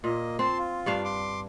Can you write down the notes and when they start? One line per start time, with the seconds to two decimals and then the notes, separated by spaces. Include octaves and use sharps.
0.04 A#2 A#3 D#5
0.39 C4 A5 C6
0.58 F4
0.86 G2 D4 F5
1.04 C6 D6